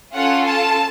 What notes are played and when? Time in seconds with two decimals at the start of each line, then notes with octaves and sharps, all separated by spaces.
0.14 C#4 F4 A4 F#5
0.46 A5